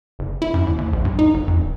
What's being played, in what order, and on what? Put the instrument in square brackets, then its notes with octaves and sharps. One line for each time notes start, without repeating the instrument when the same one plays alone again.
[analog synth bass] F#1
E4
F#2
D#2
D#2
A#1
G2
D#4
G1
F2
D1